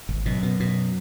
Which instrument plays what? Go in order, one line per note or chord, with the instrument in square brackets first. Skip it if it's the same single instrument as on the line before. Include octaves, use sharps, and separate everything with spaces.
[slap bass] G#1
[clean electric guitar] F#2 F#3 [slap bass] B2
[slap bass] B2
B2